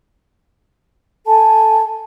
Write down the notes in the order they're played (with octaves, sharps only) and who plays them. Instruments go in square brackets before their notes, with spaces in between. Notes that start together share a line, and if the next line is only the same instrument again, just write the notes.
[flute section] A4 G#5 A5